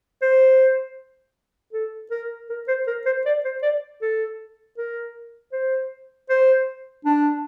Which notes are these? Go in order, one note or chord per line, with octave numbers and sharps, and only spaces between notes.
C5
A4
A#4
A#4
C5
A#4
C5
D5
C5
D5
A4
A#4
C5
C5
D4